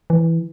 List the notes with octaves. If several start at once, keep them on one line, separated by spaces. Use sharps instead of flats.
E3